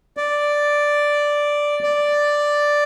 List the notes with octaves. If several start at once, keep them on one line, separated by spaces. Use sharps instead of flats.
D5
D5